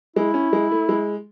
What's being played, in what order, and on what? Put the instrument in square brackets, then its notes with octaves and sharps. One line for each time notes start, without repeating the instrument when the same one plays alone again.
[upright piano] G#3 [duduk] E4
[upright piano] C#4
G#3
A3
G#3